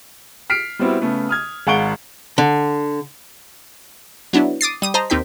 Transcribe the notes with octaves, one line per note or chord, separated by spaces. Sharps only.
F6 B6 C7 D7
G3 B3 C4 E4 F#4
C#3 A3 B3
D#6 F6 G#6
G#1 F5 F#5 C#6 D7 G7
D3
F#3 B3 D4 E4
D6 D#6 A6 C7
G3 D#6 D#7
C5 D#5 A5 A#5
D#2 C4 D#4 G5 B6